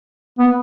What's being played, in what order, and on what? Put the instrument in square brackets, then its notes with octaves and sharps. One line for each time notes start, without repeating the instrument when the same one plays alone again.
[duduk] B3